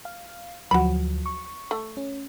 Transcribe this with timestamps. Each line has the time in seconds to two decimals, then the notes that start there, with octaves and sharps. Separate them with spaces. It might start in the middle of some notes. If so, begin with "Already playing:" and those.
0.05 F5
0.71 D2 F3 F#3 F#4 B5
1.26 C#6
1.71 A3
1.97 C#4